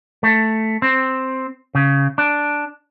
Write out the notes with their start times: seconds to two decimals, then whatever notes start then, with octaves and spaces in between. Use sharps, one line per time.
0.23 A3
0.82 C4
1.75 C#3
2.18 D4